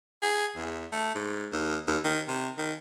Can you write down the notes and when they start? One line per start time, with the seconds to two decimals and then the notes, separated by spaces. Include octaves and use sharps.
0.22 G#4
0.55 E2
0.92 A3
1.15 G#2
1.52 D#2
1.87 D#2
2.04 D#3
2.28 C3
2.58 D#3